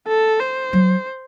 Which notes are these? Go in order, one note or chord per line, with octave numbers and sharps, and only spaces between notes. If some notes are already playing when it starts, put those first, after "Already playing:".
A4
C5
F#3